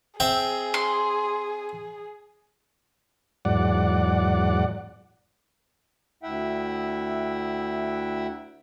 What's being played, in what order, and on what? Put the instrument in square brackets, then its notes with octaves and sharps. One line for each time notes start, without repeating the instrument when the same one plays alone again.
[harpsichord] C4 E5 G5 [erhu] G#4
[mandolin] C6
[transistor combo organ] E2 G#2 F#3 D5 F#5
[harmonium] D2 E4 E5 F#5 G5